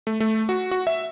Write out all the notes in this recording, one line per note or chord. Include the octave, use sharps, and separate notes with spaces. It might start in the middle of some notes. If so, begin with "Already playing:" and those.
A3
A3
F#4
F#4
E5